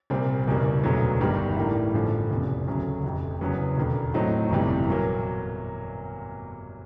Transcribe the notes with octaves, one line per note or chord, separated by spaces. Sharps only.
C2 A#2 G3 C4
F#1 E2 B2 G3 A#3
E1 D2 D3 F#3 B3
G1 G2 D#3 G3 A#3
A2 E3 G3 A#3 D4
A1 G2 D3 F3
F1 E2 C#3
D2 C#3 F#3 A3
F1 F2 C3
F#1 E2 C#3 F#3 B3
E1 D#2 D3
A2 F#3 A3 C4 D#4
G1 F2 C3 E3 G3
A#2 F#3 A#3